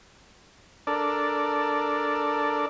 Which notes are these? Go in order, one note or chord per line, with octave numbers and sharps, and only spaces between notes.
D4 A4 A#4 D5